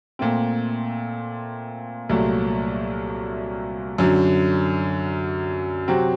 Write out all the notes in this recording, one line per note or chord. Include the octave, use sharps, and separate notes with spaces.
A#2 A3 C4
C2 A#2 F#3 A3
F#2 D3 F#3
C3 F#3 C4 F#4